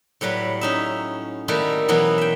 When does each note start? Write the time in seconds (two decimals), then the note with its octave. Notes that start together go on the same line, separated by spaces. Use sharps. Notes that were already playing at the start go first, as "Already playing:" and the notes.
0.21 A2 F#3 G3 B4
0.61 C#4 D#4 E5
1.48 D#3 G3 A3 D#4 E4 F#4
1.88 B2 E3 F#3 A#3 B3
2.18 E5 G5